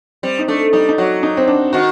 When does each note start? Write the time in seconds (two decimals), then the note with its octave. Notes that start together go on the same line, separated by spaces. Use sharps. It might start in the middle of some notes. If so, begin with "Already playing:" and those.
0.23 G3 C4
0.39 D#4
0.48 A3 D4
0.73 G3 D#4
0.89 D#4
0.98 F#3 F#4
1.23 D#4
1.37 C4
1.48 D4
1.73 D#3 F#4